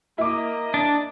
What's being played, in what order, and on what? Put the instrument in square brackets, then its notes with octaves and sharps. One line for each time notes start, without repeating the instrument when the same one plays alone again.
[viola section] A#3 D#5 [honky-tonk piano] E4 D6
[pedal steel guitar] D4